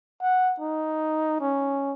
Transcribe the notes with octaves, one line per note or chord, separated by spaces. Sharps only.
F#5
D#4
C#4